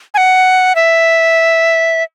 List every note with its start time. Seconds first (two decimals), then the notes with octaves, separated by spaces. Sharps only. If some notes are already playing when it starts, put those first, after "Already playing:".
0.14 G#5
0.18 F#5
0.75 E5